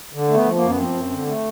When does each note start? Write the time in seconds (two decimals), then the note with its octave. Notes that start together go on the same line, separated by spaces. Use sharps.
0.13 D3
0.28 A3
0.34 B3
0.44 F3
0.55 A#3
0.61 F#2
0.69 B3
0.77 F3 C4
0.93 F#2
1.10 D3
1.26 A3